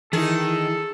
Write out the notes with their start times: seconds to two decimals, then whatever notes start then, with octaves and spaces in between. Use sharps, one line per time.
0.13 D#3 E3 E4 G#4 A4